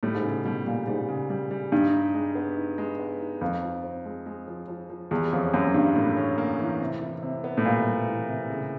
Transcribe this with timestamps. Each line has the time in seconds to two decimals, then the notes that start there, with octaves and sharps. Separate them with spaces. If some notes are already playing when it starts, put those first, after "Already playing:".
0.03 A2 G3
0.15 G#2
0.24 A2 C#3
0.45 B2 G3
0.66 A#2 G3
0.87 G#2 G3
1.09 C#3
1.30 G3
1.51 G3
1.72 G2 D#4
1.93 D#4
2.14 G#3
2.35 B3
2.57 D#4
2.78 G#3
2.99 B3
3.20 D#4
3.41 F2 F3
3.63 F3
3.84 C4
4.05 G#3
4.26 G#3
4.48 F3
4.68 F3
4.90 F3
5.11 E2 G3
5.33 F2 C#4
5.53 F#2 A#3
5.74 G2 G3
5.95 A2 A#3
6.17 C#4
6.38 A#3
6.59 E3
6.80 C3
7.02 E3
7.23 C3
7.44 B3
7.57 A2
7.65 A#2 G3
7.87 G3
8.08 E3
8.29 C3
8.50 C#3